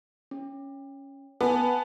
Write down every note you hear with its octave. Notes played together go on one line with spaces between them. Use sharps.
C#4
B3 G#5 A5